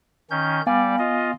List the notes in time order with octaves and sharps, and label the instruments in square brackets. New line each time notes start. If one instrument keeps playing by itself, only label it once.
[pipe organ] D#3 C#4 G6
[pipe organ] G3 D5 [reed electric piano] B3 F5 G#5
[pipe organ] F4 D#5